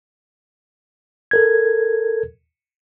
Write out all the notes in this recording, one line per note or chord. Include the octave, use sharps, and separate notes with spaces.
A4 A#4 G#6